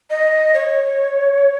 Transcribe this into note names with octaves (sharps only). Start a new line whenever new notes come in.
D#5
C#5